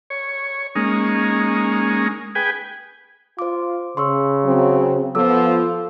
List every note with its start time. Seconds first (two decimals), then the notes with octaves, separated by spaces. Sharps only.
0.10 C#5
0.75 G#3 A#3 C#4 D#4
2.35 G#4 B4 G5 G#5
3.39 F4 C5 D6
3.97 C#3 C6 C#6 E6
4.44 F#3 C4
5.15 F3 B3 A4 D6 E6
5.44 F4